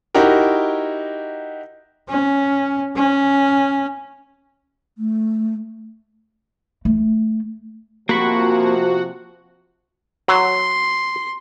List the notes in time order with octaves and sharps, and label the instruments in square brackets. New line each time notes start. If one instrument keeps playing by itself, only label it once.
[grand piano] D#4 E4 F#4 G4 A#4
[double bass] C#4
C#4
[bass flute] A3
[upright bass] A3
[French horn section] C3 F3 [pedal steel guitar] A#3 B5 C#6 [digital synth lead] F#4
[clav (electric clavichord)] F#3 [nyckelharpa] C6